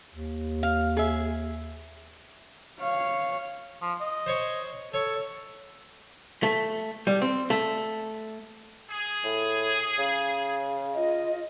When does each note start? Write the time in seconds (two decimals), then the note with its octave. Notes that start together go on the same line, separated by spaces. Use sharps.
0.14 D#2
0.63 F5
0.97 G#4 E5
2.80 C#5 F5
3.82 F3
4.00 D#5
4.26 C5 C#5
4.94 A4 C#5
6.43 A3
7.07 G3
7.22 C4
7.50 A3
8.90 G#4
9.24 A2
9.99 C#3
10.95 F4 D#5